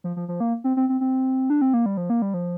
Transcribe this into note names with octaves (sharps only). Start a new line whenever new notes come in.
F3
F3
F3
A#3
C4
C4
C4
C4
D4
C4
A#3
G3
F3
A#3
G3
F3